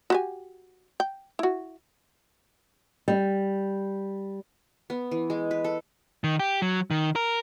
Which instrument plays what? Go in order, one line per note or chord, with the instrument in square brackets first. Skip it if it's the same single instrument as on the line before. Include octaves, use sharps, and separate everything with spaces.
[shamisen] F#4 G4 G#5
G5
E4 F#4
[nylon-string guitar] G3
[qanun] B3
E3
G#3
B4
A4
[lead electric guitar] D#3
G4
F#3
D#3
A#4